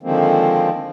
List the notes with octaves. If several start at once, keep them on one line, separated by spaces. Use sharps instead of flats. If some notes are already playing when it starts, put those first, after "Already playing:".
D3 D#3 F3 G#3 A#3 C4